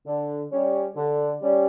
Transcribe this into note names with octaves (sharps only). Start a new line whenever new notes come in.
D3
G3 C#4
D3
G3 C#4